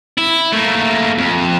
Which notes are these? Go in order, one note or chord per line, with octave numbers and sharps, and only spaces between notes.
E4
A3 A#3
F2